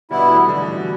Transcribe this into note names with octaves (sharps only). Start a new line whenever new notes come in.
B2 D3 G3 B3 E4
E3 A3
D3 G3
B2 E3
B2